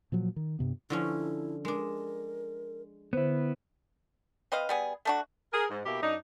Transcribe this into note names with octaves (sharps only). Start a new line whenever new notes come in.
A#2 F3 F#3
D#3
G2 C3 B3
D3 F3 C#4 E4
G#3 D4 A#4
D3 B3 E4 C5
C4 B4 D#5 F5
G3 B3 G#4
A3 D4 F#4
G#4 A#4
G#2
B2 A#3 E4 G4
F#2 D4 D#4